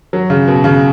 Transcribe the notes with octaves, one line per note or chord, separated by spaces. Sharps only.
F#3
C#3
B2
C#3